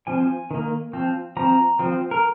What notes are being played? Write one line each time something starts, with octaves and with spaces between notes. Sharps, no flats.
F3 C4 G#5
D#3 A#3
F3 C4
F3 C4 A#5
F3 C4
A#4